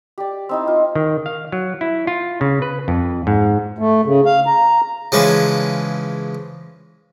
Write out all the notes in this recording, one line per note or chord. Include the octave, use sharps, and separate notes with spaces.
G4 D5
C4 D#4 E4
F4
D#3
F5
F#3
E4
F4
C#3
B4
F2
G#2
A3
C#3
F5
A#5
C#3 E3 F3 G#3 C#4 B4